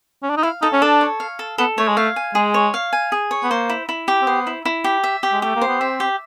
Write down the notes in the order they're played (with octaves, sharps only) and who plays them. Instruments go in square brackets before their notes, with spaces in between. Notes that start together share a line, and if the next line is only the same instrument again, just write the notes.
[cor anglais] C#4
D4
D#4
[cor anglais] E4 [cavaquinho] F5
[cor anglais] D#4 [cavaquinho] A4
[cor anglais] C#4
[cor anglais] D4 [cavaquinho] A4
[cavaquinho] C#5
F5
A4
[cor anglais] B3 [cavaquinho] A4
[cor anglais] A3 [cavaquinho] C#5
[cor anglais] G#3
[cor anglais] A3 [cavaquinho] F5
[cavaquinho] G#5
[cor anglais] G#3 [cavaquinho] G#4
[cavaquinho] C#5
F5
G#5
G#4
C#5
[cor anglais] B3
[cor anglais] A#3 [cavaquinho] C5
[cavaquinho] E4
E4
G4
[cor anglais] C4
[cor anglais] B3 [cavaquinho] C5
[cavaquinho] E4
E4
G4
E5
G4
[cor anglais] G#3
[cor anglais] A3 [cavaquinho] G4
[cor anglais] A#3
[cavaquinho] C5
[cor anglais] B3
[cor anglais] C4 [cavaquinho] E5
[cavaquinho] G4